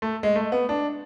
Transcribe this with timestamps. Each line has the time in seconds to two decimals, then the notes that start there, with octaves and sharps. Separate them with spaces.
0.02 A3
0.23 G#3
0.36 A3
0.52 B3
0.69 D4